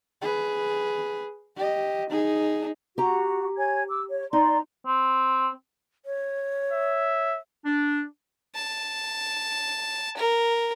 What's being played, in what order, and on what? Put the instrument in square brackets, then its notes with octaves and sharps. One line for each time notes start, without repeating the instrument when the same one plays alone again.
[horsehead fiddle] G#4 B4
G4 D#5
D#4 G#4
[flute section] F#4 [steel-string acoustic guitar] G4 A#5
[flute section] C#5 G#5 G#6
D6 E6
C#5
[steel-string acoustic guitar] D#4 [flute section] D5 A#5 C6
[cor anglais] C4
[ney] C#5
[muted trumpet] E5
[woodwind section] D4
[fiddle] A5
A#4